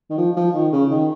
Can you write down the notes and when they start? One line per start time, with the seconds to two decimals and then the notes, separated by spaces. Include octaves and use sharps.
0.10 D#3
0.18 F3
0.37 F3
0.54 D#3
0.73 C#3
0.91 D#3